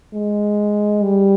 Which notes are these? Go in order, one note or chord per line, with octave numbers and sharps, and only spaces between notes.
G#3
G3